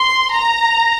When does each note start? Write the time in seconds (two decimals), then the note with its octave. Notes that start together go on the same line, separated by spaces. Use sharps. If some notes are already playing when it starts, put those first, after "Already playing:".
Already playing: C6
0.33 A#5